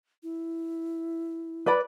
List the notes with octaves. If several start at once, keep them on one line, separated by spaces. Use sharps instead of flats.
E4
B4 D5 B5